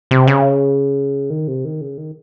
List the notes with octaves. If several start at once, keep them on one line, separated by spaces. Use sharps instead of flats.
C3
C#3
D#3
C3
D#3
C#3
D#3